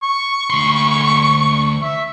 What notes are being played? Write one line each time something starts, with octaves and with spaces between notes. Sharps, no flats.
C#6
D2 C6
E5